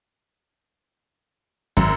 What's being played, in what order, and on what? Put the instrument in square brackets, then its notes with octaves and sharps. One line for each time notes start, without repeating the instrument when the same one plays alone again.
[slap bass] G#1 [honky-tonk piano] F#2